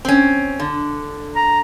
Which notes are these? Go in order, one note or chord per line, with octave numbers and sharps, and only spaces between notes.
C4 C#4
D3
A#5